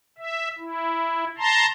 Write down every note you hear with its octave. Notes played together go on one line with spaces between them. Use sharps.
E5
E4
A5 A#5 C6